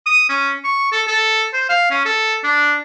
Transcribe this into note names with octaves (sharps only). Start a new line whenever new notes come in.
D#6
C#4
C#6
A4
A4
C5
F5
C#4
A4
D4